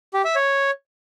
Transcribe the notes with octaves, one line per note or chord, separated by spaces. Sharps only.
G4
E5
C#5